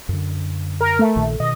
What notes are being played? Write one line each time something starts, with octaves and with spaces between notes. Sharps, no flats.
F#2 D3
A#4
A3
A#1 A#2 D#3
B2 D#3 D#5